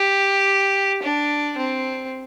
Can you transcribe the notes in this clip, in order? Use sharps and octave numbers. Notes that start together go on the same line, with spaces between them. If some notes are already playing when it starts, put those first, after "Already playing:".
Already playing: G4
D4
C4